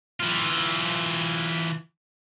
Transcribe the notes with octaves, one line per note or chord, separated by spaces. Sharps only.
E3 F4